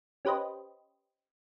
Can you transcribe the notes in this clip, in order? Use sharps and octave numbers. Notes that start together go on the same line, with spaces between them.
C#4 G4 B4 C5 D#5